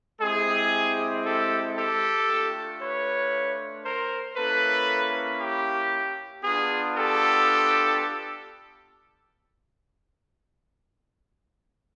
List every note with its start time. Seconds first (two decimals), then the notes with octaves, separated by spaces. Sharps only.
0.21 G#3 C4 E4 G4 G#4
1.25 G4 A4
1.77 G4 A4
2.29 A3 D4 F4
2.81 B4 C#5
3.85 A#4 C5
4.36 A#3 C#4 E4 A4 B4
5.40 G4
6.43 B3 D4 F4 G#4
6.96 G4 A4